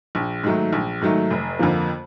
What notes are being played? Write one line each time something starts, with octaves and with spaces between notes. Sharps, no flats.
A#1
G#2 D#3 F#3 A3
A#1
G#2 D#3 F#3 A3
F1
F2 D3 F3 A#3